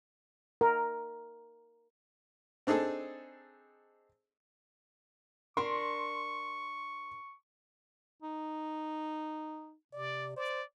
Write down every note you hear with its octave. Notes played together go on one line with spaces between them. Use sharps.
A#4
C4 D4 D#4 G#4 A4
D4 A#4 C6 C#6
D#4
C3 D5
C5 D5